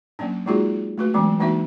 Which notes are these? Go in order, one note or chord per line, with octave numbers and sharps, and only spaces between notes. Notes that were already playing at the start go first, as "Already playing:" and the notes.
F#3 A#3 C#4 D4
G#3 A#3 D#4 F4 F#4 G#4
A3 F#4 B4
E3 F#3 G#3 B3 C#4 D4
E3 A#3 D4 D#4 F#4 E5